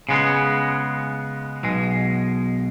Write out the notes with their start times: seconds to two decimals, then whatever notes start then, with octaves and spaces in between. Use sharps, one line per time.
0.09 C#3 G#3 B3
1.63 B1 B2 G#3